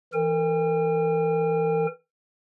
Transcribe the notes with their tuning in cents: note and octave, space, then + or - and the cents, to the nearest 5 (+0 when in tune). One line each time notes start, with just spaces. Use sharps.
E3 +0 A#4 -40 G5 +45